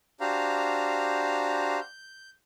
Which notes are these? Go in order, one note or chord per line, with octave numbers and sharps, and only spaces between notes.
D4 F#4 G4 C5 F5 A#5
G6